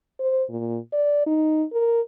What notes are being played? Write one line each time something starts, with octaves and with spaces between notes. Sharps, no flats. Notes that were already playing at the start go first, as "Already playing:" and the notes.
C5
A#2
D5
D#4
A#4